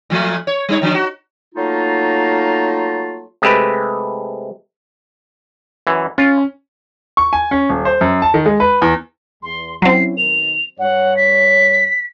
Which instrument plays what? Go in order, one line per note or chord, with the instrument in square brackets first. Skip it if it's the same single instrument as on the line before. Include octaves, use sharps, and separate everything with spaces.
[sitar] A#2 F3 A3
C#5
G3 D#4 C#5
D#3 F3 D4
F#4
[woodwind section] F#3 A3 A#3 D#4 F4
[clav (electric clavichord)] C3 G#3 A3 G4 B4
F#2 E3
[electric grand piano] C#4 [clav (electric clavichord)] F4
[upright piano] C#6
G#5
C#4
D#1
C5
F#2
A5
D#3
G#3
B4
E2
[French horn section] E2 [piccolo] C6
[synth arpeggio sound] F#3 C4 [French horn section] C#4 E4 [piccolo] C7
[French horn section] B2 D#3 A#4 [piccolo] F7
[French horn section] G2 C#5 [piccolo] F#5
[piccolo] B6